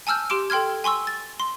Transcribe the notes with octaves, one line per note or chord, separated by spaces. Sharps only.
G#5 A5 E6 F6 G6
G4 C6 D6 D7
A4 G5 C6 F6 G#6
G#5 C6 C#6 E6
A6
C6